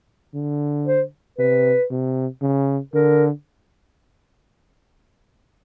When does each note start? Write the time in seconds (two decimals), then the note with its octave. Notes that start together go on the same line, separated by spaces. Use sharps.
0.34 D3
0.86 C5
1.38 C3 B4
1.90 C3
2.42 C#3
2.94 D3 A#4